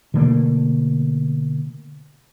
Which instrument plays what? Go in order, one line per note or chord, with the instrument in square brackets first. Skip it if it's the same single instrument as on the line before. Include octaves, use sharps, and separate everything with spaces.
[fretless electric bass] B2 D3 A3 A#3